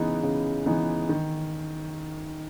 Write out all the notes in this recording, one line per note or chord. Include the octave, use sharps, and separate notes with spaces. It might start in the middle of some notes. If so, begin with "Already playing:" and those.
Already playing: C#3 E3 G#3 B3 D#4
C#3
E3 G#3 B3 D#4
D#3